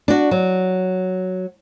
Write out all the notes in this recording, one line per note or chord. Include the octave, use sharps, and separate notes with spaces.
D4 F#4
F#3